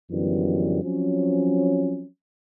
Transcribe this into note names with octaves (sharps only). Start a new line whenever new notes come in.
F#2 D3 E3 F3 G3 B3
F3 F#3 C4 C#4